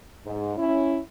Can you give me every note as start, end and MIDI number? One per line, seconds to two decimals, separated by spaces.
0.25 0.53 44
0.57 0.98 61
0.57 0.98 64